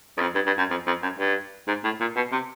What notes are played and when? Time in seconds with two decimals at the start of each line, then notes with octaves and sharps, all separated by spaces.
0.18 E2
0.21 F2
0.35 G2
0.46 G2
0.58 F#2
0.70 F2
0.87 F2
1.03 F#2
1.19 G2
1.67 G#2
1.84 A2
2.00 A#2
2.16 B2
2.32 C3